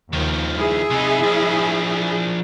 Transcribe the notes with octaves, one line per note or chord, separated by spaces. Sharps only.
D#2 D#3 F3
E4 G#4 E5
C3 D#4
F3 D4